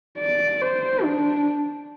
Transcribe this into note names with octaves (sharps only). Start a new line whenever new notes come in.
D5
C5
D4